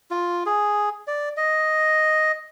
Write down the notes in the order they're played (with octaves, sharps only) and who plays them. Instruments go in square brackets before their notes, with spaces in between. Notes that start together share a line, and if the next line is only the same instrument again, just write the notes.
[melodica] F4
G#4
D5
D#5